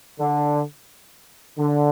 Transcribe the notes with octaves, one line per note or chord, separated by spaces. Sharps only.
D3
D3